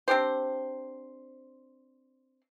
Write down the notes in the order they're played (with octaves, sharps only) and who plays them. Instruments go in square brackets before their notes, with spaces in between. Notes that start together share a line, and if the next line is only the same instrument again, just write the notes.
[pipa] C4 D4 G4 C5